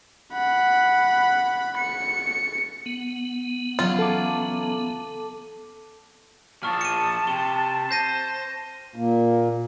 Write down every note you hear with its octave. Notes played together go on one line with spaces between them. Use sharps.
F#5 B5
C#7
B3
C#3 E3 F#3 F4
A4 A5 D6
A#2 F3 A5 C#6 F6
C#7 D#7
C3 G7
C5 G6 A#6 D#7
A#2 A#3